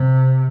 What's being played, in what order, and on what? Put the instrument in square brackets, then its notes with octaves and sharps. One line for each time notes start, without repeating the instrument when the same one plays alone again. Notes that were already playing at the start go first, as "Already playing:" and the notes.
Already playing: [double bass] C3